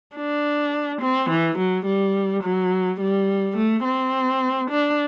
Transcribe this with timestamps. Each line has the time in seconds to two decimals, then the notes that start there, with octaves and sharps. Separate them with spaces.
0.15 D4
1.01 C4
1.30 E3
1.58 F#3
1.86 G3
2.43 F#3
3.00 G3
3.57 A3
3.85 C4
4.70 D4